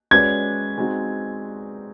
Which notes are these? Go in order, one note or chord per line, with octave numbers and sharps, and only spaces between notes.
G#3 C#4 F#4 B4 D5 G#6
G#3 C4 D#4 F#4